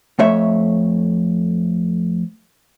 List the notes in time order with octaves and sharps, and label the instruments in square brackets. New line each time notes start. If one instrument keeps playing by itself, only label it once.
[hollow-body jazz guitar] F2 A3 C#5 E5